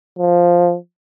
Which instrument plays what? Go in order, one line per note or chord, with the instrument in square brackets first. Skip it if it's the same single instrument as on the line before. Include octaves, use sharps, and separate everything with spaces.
[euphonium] F3